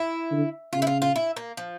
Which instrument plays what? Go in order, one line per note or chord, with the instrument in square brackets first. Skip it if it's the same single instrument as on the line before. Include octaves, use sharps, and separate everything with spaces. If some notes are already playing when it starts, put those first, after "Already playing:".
Already playing: [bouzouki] E4
[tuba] D3
[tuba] C#3 [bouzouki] F4
[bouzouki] E4
F4
F4
E4
A#3
F3